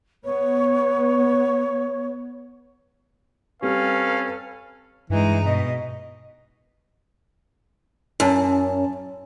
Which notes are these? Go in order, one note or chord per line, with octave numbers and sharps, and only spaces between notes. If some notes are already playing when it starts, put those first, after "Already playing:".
B3 C#5
G3 C4 C#4 G4 A4 B4 F5 G5
G2 E3 G#3 D#4
B2 D#5
F#2 C#4 A5